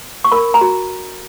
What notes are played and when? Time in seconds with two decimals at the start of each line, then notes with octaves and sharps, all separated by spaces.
0.24 C#6
0.32 A#4 B5
0.54 A#5
0.61 F#4